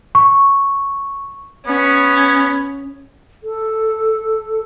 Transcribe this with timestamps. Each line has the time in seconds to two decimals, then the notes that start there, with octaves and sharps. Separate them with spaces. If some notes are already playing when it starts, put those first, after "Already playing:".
0.15 C#6
1.67 B3 C#4
3.43 A4